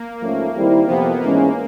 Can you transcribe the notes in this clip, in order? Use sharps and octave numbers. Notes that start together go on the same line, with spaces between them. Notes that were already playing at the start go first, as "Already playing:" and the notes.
Already playing: A#3
G#2 F3 A3 C#4 F4
D#3 G3 C4 E4
F2 C3 F3 B3
G#2 E3 G#3 A#3 C#4